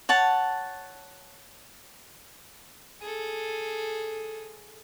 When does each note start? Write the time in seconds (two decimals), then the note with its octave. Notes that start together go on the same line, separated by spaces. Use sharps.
0.09 C#5 F#5 A5
3.01 G#4 A4